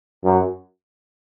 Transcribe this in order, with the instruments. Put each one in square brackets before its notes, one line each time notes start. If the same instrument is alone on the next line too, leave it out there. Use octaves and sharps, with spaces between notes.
[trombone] F#2